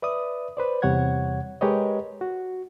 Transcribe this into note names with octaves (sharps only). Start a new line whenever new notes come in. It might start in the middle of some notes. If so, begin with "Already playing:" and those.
B4 D5 E5 D#6
B4 C5 D5
E2 C3 G3 C#5 F#5 G#6
G#3 G4 A#4 B4 C#5 D#5
F#4